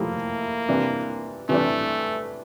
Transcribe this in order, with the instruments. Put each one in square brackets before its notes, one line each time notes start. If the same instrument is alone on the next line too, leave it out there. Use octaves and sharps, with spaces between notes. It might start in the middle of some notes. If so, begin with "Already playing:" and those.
Already playing: [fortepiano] F3 A3 E4 G4 [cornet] A#3
[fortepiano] C3 E3 G3 D4
[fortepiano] C3 E3 G3 D4 [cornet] A3